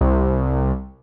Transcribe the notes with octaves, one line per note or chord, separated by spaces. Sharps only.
C2